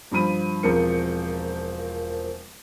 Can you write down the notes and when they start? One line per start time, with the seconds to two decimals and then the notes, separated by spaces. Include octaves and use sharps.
0.11 G2 F3 B5 D#7
0.63 E1 F3 C4 A#4 C#7